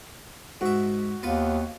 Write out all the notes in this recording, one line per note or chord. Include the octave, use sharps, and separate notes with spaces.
G#2 F#4 E5
D#2 B3 F4